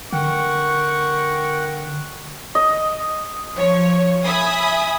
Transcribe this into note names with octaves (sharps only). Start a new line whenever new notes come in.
D3 A#4 F#5 G5 C#6
D#5
F3 C#5
E5 G#5 B5 D#6